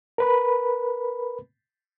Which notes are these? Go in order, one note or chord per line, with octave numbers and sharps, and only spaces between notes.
A#4 B4 B5